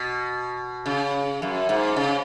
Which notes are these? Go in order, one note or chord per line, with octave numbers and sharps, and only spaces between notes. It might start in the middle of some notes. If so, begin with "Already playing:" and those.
Already playing: B2
C#3
F#2
G#2
C#3